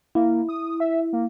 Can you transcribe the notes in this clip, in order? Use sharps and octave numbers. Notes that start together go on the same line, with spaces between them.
A#3 E4
D#6
E5
A#3